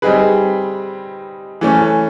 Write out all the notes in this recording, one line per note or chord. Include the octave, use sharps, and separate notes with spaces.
G3 C4 D#4 G#4 B4
E3 A3 C#4